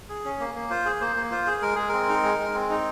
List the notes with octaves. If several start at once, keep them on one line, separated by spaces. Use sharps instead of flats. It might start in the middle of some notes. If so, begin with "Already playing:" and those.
G#4
C#4
A#3
A#3
F4 C5
G#4
A#3 C5
A#3
F4 C5
G#4
G#3 A#4
G#3 G#4
C4 A#4
D#4
G#3
G#3
C4
D#4